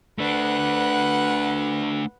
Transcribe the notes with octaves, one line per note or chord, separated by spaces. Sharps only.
A3 D4 B4 F#5